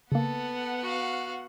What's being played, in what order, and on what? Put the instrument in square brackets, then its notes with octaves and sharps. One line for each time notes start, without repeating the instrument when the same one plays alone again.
[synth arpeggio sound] C#3 A#3 [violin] B3 F#5 [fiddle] A4
[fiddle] F#4 F5